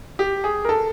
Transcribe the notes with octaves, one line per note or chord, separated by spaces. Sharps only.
G4
G#4
A#4
A4